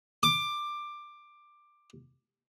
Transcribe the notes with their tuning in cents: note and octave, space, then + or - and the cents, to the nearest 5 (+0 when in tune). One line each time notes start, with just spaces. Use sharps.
D6 +15